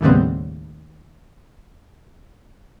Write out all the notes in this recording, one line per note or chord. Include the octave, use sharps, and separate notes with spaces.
D#2 A2 C#3 G3 B3 C4